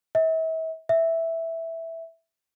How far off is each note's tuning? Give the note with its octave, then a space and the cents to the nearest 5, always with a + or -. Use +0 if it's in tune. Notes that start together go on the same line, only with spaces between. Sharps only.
E5 -40
E5 -5